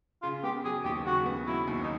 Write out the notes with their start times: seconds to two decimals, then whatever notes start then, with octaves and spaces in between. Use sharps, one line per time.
0.22 C#3 F4
0.43 B3 G4
0.64 F#3 G#4
0.84 D#2 G4
1.05 C#3 F#4
1.26 B3
1.47 F#3 E4
1.68 D#2
1.83 D#4